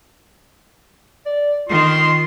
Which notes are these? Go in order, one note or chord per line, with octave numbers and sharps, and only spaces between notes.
D5
D#3 F4 C6